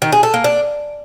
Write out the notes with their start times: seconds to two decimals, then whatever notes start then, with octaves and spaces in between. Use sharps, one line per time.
0.02 D#3
0.12 G#4
0.23 A4
0.34 A#3
0.44 D4